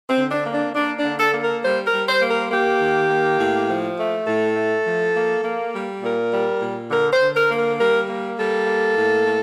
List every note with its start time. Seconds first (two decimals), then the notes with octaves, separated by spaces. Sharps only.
0.09 C4
0.16 D3
0.31 D4
0.46 A#3
0.54 D4
0.75 A#3 D4
0.98 D4
1.04 D3
1.19 A4
1.33 A#3
1.41 A#4
1.63 G3 C5
1.86 A#4
1.92 G3
2.08 C5
2.21 A#3
2.29 A#4
2.51 A#3 G4
2.81 D#3
3.10 A#3
3.39 A2
3.68 F3
3.98 A3
4.27 A2 A4
4.56 A3
4.86 F3
5.15 A#3
5.44 A#3
5.73 G3
6.03 A#2 A#4
6.33 G3
6.61 A#2
6.90 D3 A#4
7.13 C5
7.20 D3
7.35 A#4
7.50 A#3
7.57 A#4
7.79 G3 A#4
8.08 A#3
8.37 G3 A4
8.67 A#3
8.96 A2
9.26 A2